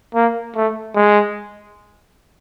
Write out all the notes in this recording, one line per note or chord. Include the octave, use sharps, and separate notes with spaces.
A#3
A3
G#3